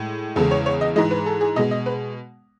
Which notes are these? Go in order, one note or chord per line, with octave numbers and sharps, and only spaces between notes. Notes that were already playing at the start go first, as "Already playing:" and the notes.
Already playing: A2 G#3
E2 C#3 E3 G#3 A4
C#5
C#5
D#5
G#2 E3 G#3 D#5
B4
A4
G#4
B2 G#3 D#5
D#5
B4